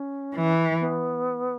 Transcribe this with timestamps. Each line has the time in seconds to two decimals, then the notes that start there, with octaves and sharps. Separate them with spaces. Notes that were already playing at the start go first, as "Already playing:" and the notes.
Already playing: C#4
0.36 E3
0.80 B3